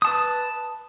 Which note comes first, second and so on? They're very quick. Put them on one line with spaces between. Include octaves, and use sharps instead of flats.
D#6 A5 B4